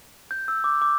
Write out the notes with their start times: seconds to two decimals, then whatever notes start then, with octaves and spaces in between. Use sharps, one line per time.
0.31 G6
0.48 E6
0.64 D6
0.82 D6